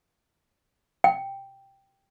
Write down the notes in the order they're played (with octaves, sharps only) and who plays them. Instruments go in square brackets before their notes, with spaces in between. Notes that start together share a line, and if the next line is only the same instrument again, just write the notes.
[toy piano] G5